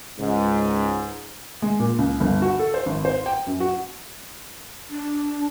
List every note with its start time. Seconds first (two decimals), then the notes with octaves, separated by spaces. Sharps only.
0.19 C#2 G#2
1.62 G#3
1.80 A#2
1.98 C#2
2.20 G1
2.42 F#4
2.59 A4
2.74 C5
2.86 G#1
3.05 C5
3.26 G5
3.47 F#2
3.60 F#4
4.90 D4